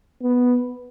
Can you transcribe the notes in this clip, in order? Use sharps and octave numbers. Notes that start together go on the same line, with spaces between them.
B3